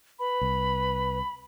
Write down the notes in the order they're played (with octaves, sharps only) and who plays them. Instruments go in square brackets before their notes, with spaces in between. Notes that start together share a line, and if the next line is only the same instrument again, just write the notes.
[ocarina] B4 [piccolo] B5
[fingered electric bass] C2